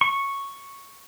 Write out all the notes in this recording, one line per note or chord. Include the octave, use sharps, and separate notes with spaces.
C#6